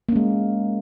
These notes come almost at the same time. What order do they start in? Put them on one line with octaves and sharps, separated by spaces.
A#3 C#4 G#3